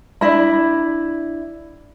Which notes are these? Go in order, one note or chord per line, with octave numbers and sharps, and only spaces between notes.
D4 E4 B5